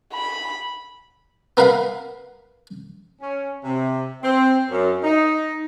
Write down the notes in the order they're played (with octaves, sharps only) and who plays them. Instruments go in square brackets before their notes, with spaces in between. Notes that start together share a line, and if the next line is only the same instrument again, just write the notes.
[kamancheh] B5
[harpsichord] B3 A#4 B4 F5 F#5 B5
[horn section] C#4
C3
C4
F#2
D#4